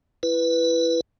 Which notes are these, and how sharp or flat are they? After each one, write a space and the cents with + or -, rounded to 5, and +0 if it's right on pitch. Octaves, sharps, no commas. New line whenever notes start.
E4 +20 B4 +0